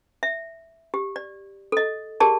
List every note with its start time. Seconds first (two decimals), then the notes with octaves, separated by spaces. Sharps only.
0.23 E5
0.94 G4
1.16 D5
1.72 A4 D#5
2.20 G4 G#4 A#4 D5 A5